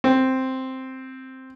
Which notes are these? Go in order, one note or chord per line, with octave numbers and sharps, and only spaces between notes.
C4